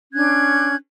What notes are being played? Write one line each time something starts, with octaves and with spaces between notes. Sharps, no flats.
C#4 D4 F#6 G#6